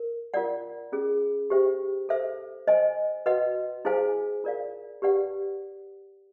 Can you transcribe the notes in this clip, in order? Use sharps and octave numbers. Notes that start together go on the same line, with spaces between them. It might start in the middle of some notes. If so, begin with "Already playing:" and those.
Already playing: A#4
F4 A#4 D5 F#5
C#4 F4 G#4
G4 C5 E5 G5
A4 C5 E5
C5 D#5 G#5
F#4 B4 D#5 F#5
E4 G#4 C5 F5 G#5
F4 A#4 D5 F5
G4 B4 D5 F#5